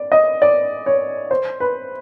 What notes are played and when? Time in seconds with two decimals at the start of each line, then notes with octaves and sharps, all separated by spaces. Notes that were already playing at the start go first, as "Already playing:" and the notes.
Already playing: D5
0.12 D#5
0.42 D5
0.86 C#5
1.31 C5
1.60 B4